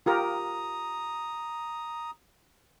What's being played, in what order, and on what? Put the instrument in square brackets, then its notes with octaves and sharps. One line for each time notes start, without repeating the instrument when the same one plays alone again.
[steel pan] F4 G4 A#4 [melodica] A#5 D#6